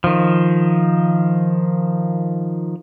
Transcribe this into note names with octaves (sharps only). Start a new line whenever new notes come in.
D#3 F3